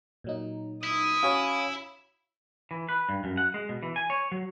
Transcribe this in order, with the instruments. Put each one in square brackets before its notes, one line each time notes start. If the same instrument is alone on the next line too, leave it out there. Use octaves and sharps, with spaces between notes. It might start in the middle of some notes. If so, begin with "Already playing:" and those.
[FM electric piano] A#2 F#3 D#4
[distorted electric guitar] E4 [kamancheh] D#6
[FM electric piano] C#4 F#4 C#5 [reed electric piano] F5 G#5 B5
[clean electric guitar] E3
B4
G2
F#2
F#5
G#3
B2
E3
G#5
C#5
F#3